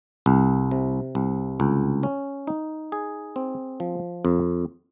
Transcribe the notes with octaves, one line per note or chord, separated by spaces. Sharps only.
C2
C3
C2
C#2
C#4
D#4
G#4
C4
F3
F2